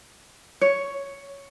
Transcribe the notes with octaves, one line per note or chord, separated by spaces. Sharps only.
C#5